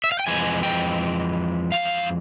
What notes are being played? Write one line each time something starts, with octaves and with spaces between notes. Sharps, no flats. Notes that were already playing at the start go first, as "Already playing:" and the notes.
E5
F5
G5
F2 E3 G#3 G#5
G5
F5